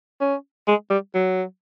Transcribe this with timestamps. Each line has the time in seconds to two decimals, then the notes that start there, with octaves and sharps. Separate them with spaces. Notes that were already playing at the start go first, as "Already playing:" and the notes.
0.21 C#4
0.68 G#3
0.91 G3
1.15 F#3